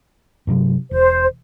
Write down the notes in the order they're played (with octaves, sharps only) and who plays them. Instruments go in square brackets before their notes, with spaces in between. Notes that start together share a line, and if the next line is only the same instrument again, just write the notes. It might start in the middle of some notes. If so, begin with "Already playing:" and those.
[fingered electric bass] G2 C3 F#3
[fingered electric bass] E1 [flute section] C5